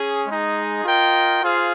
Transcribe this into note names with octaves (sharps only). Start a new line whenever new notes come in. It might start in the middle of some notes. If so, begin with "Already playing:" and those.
Already playing: C#4 G#4
G#3 D#4 G#4
F4 A#4 D#5 G5
F4 G#4 C5 F5